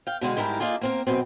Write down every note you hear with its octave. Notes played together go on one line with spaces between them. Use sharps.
F5 G5
B2 D3 G#3 F5
G#2 G3 E4 A#4 G5
A#3 D4 D#4 F4 G#4 A4
A#3 C4 A#4
F#2 B2 C4